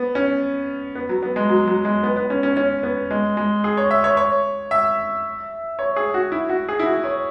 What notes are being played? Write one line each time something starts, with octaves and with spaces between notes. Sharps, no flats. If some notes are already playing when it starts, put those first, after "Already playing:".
Already playing: B3
C#4
B3
F#3
B3
G#3
F#3
F#3
G#3
B3
B3
C#4
C#4
C#4
B3
G#3
G#3
G#4
C#5
E5
C#5
C#5
E5
C#5
G#4
F#4
E4
F#4
G#4
E4
F#4
C#5